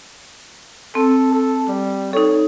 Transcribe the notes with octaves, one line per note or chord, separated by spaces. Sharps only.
C4 A4
A4
G3
D#4 A4 C#5